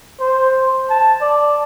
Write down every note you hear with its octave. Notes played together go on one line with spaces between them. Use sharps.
C5
A5
D5